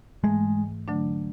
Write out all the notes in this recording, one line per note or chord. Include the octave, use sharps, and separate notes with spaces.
G#2 E3 G#3 A3
D3 F#3 A3 D4